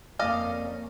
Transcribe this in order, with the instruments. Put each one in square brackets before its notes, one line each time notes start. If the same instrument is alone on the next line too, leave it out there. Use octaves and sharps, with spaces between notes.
[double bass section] F2 A#3 C#4 [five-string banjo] D5 D#5 F5